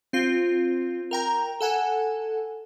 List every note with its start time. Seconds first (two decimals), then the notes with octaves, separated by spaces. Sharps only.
0.13 C4 F4
1.11 A#4 G5 A#5
1.61 A4 F#5 G#5